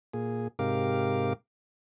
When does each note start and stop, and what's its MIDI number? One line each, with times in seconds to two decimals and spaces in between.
0.13 0.48 46
0.13 0.48 68
0.59 1.33 44
0.59 1.33 48
0.59 1.33 67
0.59 1.33 70
0.59 1.33 77
0.59 1.33 86